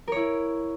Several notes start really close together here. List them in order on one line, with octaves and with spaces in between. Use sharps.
A#4 C#5 E4